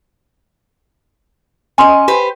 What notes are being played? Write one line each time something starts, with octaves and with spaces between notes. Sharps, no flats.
C#4 D#5 G#5 C6
G4 B4 C5